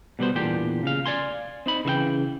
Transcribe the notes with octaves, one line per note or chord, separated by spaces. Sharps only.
B2 G3 B3 C5
E2 A#2 D4 G4 G5
C#3 F5
D5 F5 G#5 C6
C4 D#4 B5
C#3 E3 E5 G5